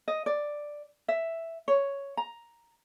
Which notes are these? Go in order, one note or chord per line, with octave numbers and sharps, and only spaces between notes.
D#5
D5
E5
C#5
A#5